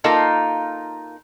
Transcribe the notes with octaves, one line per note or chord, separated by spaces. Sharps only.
A#3 D#4 F4 A4 A#4